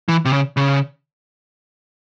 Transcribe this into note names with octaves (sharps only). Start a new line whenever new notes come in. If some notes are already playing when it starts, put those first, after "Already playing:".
E3
C3
C#3
C#3